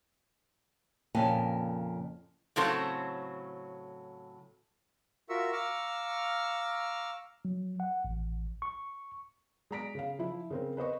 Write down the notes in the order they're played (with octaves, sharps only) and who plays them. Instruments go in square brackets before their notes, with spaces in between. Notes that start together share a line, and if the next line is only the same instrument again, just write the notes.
[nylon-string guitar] F2 A#2 C#3 A#3 G#5 A5
[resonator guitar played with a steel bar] A2 C#3 F#3 C4 A4
[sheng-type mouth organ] F4 F#4 A#4 E5 C#6 E6
F5 A#5 C#6 D6 E6 F6
[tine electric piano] F#3
F#5
A1
C#6
[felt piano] G#3 D5 A#5 B6 D7
C#3 F5
F3 E4
C#3 C4 A#4
B4 C5 D#5 C#6